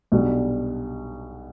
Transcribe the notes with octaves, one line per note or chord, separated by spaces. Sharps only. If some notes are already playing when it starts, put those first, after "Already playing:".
B1 B2 G3 D4